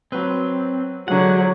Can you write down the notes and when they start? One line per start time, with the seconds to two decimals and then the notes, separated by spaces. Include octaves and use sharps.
0.12 F#3 C4 B4
1.08 D3 F#3 G#3 F#5